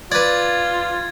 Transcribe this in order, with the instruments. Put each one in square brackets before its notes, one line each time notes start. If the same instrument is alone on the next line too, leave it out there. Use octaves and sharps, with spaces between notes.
[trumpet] F4 [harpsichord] B4 D5 [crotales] G#6 A6